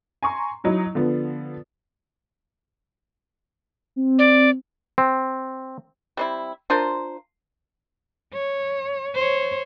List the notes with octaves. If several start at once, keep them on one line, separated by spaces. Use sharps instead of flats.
G#5 A#5 C6 C#6
F#3 D#4 E4
D3 F3 B3
C4
D5
C4
G3 C4 E4
D4 F4 A#4 C5
C#5
C5 C#5